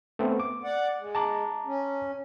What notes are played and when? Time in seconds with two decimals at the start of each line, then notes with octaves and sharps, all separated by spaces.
0.19 A3 B3 C4
0.40 D6
0.64 D5 F#5
0.98 G#3
1.15 A5 A#5 D6
1.66 C#4